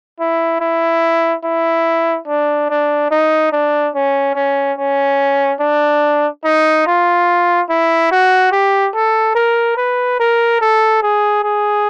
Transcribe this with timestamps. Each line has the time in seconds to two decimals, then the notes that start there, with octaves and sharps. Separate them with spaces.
0.20 E4
0.61 E4
1.45 E4
2.28 D4
2.70 D4
3.11 D#4
3.52 D4
3.95 C#4
4.36 C#4
4.78 C#4
5.61 D4
6.45 D#4
6.87 F4
7.70 E4
8.11 F#4
8.52 G4
8.95 A4
9.35 A#4
9.77 B4
10.20 A#4
10.61 A4
11.03 G#4
11.44 G#4